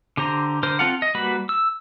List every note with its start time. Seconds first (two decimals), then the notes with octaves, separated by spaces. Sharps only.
0.17 D3 G4 C5 A#5
0.63 D3 A#4 C5
0.79 C4 F4 A4 F5 F#5
1.02 D#5
1.15 G3 A#3 F#4 B4 B5
1.49 E6